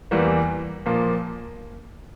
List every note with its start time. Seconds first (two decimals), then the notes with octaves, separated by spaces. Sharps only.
0.11 E2 E3 G3 A#3
0.86 A#2 F3 A#3